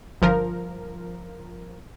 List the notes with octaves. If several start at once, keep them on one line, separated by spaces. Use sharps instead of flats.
G1 F3 A#4